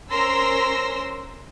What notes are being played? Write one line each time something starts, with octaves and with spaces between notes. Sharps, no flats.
C#4 A#4 C5 C6 E6 A#6